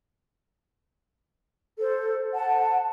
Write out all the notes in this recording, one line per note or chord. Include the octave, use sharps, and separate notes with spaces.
A4 C5
F#5 A5